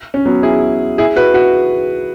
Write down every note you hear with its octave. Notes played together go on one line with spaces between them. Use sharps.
C#4
F#3 B3
E4 G#4
E4 G#4
F#4 B4
F#4 B4